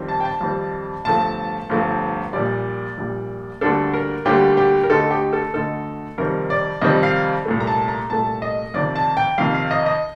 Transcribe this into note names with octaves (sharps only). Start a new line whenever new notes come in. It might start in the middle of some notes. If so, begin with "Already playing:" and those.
Already playing: F2 D#3 G3 C4
A5
G5
A5
F2 D#3 G3 C4
G1 G2 F3 A3 A5
G1 G2 F3 A3
A#1 A#2 G3 D5
A#1 A#2 G3
D2 D3 G3 A#3 D4 A4
A#4
D2 D3 G3 A#3 D4 G4
G4
A#4
D2 D3 A3 D#4 A4
G4
A4
D2 D3 A3 D#4 A4
F2 C3 D#3 G3 C4 A#4
D5
F2 C3 D#3 G3 C4 D#5
F5
C2 A#2 A3
A#5
A5
A#5
C2 A#2 A3 A5
D#5
F2 C3 D#3 D5
A5
G5
F2 C3 D#3 F5
F5
D#5
D#5